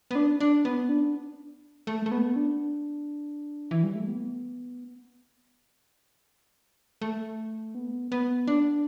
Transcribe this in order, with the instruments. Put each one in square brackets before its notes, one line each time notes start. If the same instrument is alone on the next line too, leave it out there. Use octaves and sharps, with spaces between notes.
[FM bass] B3
D4
D4
B3
D4
A3
A3
B3
D4
E3
G3
A3
B3
A3
B3
B3
D4